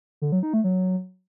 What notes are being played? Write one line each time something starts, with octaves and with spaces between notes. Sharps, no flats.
D3
F#3
D#4
A3
F#3